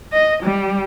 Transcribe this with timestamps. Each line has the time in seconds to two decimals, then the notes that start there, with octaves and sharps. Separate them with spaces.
0.13 D#5
0.42 G3